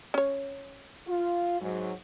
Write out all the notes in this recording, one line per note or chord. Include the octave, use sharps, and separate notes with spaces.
C#4 C#5
F4
G#2 F#3